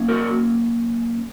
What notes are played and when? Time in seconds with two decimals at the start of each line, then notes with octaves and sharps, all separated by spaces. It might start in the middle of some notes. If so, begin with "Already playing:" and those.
Already playing: F#3 A#3 C#4
0.09 F#4 A#4